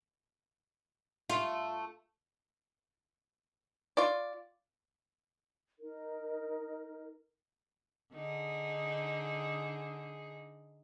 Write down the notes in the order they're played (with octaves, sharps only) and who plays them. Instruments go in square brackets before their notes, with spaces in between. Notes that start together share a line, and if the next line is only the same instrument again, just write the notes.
[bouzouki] A3 [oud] F4
[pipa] F4 D5
[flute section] D#4 A#4
[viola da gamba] D3 D#4 G#4